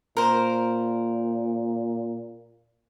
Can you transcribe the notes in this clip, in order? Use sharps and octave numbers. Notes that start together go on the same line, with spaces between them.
A#2 A#4 C5